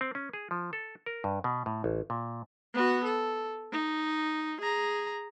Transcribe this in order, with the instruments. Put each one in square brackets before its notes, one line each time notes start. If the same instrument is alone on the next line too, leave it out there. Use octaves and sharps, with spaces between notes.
[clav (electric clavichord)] C4
C#4
G#4
F3
A4
A#4
G2
B2
A2
A1
A#2
[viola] B3 F#4
A4
D#4
G#4 A#5